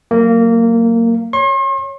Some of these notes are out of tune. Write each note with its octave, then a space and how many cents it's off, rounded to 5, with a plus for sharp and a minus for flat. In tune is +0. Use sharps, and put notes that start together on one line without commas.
F#3 +10 A#3 -20
C#5 +0 C6 +45